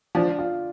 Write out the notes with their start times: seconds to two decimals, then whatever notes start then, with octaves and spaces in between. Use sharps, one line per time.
0.15 F3 D4
0.39 F4